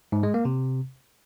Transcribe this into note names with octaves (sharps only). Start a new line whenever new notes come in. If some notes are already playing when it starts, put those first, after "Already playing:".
G#2
G#3
A#3
C3